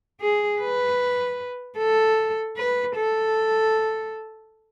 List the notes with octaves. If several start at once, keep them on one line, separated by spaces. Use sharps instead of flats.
G#4
B4
A4
B4
A4